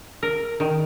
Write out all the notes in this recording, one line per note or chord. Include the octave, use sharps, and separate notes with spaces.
A#4
D#3